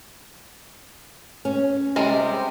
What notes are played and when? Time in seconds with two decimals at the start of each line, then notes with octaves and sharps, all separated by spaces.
1.45 C#4
1.96 C3 G3 G#3 A#4